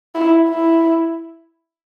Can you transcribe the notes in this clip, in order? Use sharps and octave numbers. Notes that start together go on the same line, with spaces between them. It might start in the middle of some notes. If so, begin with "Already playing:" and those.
E4
E4